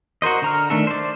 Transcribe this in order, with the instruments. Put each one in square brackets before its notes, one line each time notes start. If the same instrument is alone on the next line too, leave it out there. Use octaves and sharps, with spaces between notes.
[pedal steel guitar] F#4 A#4 C5 D#5
D3 A#5 F6
D#3 A3 D4 A4
C5 D5